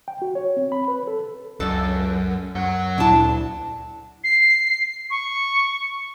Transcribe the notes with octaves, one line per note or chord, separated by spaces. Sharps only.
G5
F#4
C#5
C4
B5
B4
A4
C#2 F#2 A4 D5
F#2 F#3 F#5
D2 A#2 D4 E4 A5
C7
C#6